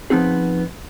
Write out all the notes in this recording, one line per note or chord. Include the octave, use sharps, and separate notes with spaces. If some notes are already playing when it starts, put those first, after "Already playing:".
F3 B3 C4 D#4 G#4